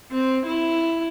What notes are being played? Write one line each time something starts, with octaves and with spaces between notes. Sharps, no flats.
C4
E4